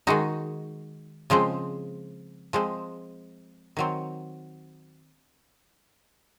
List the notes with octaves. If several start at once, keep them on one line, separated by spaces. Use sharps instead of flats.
D#3 G#3 D#4 F#4
C#3 F3 G#3 C4
F3 G#3 C4
D#3 F#3 C4